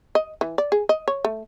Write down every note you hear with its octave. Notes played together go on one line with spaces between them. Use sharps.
D#5
E3
D5
G#4
D#5
C#5
A3